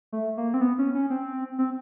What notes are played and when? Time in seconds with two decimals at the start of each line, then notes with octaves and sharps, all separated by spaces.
0.12 A3
0.37 A#3
0.54 C4
0.61 B3
0.78 C#4
0.95 C#4
1.10 C4
1.59 C4